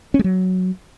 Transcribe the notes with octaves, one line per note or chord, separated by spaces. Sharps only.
C#4
G#3
F#3